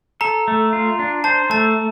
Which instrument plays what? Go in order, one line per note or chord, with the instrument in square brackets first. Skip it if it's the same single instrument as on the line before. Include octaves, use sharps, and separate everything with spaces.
[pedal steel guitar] A4 [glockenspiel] A#5
[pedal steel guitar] A3
F4
D4
[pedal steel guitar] C5 [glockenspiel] A5
[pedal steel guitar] A3 [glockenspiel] A5